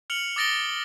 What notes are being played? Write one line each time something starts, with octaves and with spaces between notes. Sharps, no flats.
F6 C#7 F7 F#7
D6 D#6 A6 A#6 D7 G7